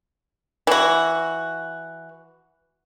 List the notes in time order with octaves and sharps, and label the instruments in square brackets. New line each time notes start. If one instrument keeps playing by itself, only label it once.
[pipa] E3 F#4